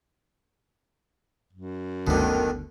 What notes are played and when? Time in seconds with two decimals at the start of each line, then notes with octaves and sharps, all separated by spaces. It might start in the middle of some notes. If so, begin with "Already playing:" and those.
1.53 F#2
2.07 G1 D2 B2 D3 D#3